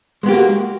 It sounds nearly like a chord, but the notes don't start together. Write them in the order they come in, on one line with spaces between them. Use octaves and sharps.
G#3 B3 G4 A#3 F#4